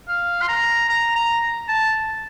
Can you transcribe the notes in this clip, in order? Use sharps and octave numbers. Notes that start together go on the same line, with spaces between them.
F5
C6
A#5
A#5
A#5
A5